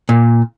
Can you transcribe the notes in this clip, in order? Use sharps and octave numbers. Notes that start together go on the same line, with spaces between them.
A#2